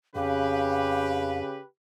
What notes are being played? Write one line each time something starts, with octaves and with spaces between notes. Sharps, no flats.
F2 C#3 G4 B4 F5